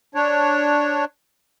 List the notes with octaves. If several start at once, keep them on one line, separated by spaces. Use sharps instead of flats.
D4 C#5